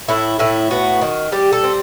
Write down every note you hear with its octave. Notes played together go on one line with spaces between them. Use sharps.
A2 E4
A2 E4
B3 F#4
D#3
G3 G4
A4
C4